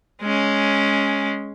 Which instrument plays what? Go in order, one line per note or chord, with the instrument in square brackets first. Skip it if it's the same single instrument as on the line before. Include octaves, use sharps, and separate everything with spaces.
[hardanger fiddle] G#3 C#4